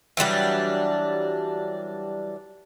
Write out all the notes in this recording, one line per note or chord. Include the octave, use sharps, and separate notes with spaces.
E3 F#3 G3 D4